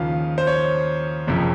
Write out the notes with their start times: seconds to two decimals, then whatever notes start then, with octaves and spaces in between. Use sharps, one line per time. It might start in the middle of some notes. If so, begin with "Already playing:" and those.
Already playing: D#2 C#3 F3 F5
0.38 C5
0.47 C#5
1.27 F#1 F2 C3 F3